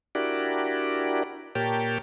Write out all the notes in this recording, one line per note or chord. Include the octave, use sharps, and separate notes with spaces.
D4 E4 F#4 G4 A#4 D5
A#2 G4 A#4 C#5 G5 A5